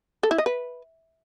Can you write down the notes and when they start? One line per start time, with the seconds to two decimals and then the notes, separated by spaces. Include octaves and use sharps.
0.23 A4
0.31 E4
0.38 D#5
0.46 B4